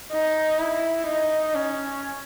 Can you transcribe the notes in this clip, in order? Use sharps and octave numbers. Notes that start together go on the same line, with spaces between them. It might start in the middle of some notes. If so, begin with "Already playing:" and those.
D#4
E4
D#4
C#4